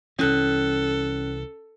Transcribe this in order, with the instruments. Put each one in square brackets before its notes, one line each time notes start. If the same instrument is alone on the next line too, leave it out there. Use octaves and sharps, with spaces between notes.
[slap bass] C2 E3 [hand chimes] C#4 F#6 [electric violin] A4